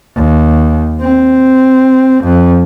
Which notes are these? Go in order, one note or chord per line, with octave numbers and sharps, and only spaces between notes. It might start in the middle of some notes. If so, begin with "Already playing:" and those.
D#2
C4
F2